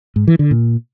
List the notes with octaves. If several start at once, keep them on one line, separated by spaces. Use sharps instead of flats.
G#2
E3
D3
A#2